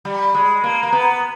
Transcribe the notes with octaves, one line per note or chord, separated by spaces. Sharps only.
G3
G#3
A#3
A#3
B3